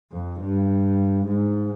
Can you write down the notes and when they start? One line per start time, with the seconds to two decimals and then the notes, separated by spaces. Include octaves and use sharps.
0.12 F2
0.41 G2
1.25 G#2